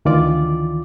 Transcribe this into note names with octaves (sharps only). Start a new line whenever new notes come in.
D2 D#3 E3 F4 D5 D6